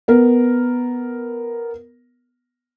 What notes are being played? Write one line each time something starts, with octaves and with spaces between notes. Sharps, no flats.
B3 A#4